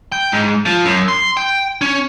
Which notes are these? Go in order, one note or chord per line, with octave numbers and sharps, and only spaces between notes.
G5
G#2
F3
F#2
C6
G5
C#4